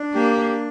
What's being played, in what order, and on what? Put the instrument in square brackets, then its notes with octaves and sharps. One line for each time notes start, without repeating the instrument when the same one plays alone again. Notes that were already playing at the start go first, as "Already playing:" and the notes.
Already playing: [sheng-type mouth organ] D4
[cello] A#3 [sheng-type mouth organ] G4
[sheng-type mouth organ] D4